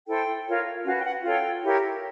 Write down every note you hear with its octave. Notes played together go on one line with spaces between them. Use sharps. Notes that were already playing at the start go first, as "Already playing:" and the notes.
E4 A4 C5 G5
F4 A#4 C#5
C#4 F#4 B4 F5
G5
F#5
F4 A4 C#5 G5
E4 G4 A#4 C#5